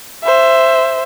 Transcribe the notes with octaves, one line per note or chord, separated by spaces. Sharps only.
C5 E5